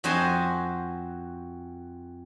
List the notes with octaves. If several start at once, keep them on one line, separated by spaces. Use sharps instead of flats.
F2 F#4 C5 D#5 G#5 A5